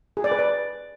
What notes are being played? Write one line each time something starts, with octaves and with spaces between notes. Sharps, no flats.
G#4
D5
B4
D5